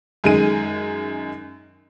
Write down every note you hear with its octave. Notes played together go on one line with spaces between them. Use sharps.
F#2 D#3 G#3 G#4 D#7